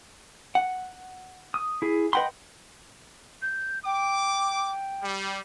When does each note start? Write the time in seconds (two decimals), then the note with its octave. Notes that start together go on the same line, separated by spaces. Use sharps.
0.55 F#5
1.54 D#6
1.82 E4 G#4
2.13 B4 D#5 F#5 G5 B5 C6
3.42 G6
3.85 G5 D6
5.02 G3